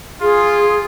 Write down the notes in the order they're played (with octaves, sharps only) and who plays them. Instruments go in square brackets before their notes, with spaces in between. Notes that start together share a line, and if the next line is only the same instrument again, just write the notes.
[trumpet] F4 [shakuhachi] G#4